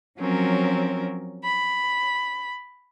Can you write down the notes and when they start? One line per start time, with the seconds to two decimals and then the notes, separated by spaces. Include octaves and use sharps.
0.19 F3 F#3 C4 C#4 A#4
1.43 B5